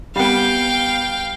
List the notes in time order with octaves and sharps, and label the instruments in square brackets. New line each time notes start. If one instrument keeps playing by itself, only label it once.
[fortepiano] G3 B3 [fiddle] F5 G5